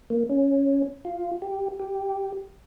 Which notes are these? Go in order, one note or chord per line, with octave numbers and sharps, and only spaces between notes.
A#3
C#4
F4
G4
G4